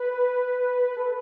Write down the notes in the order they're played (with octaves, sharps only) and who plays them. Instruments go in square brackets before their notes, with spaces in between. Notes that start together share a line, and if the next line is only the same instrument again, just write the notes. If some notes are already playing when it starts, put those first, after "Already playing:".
Already playing: [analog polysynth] B4
A4